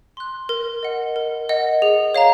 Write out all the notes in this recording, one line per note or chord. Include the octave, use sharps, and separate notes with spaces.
C6 F#6
A#4
D#5 F#5
A#4
D#5 F#5
G#4
C#5 F5 A#5